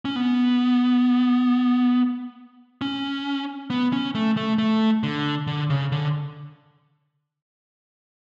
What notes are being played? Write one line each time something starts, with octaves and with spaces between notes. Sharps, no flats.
C#4
B3
C#4
B3
C#4
A3
A3
A3
D3
D3
C#3
D3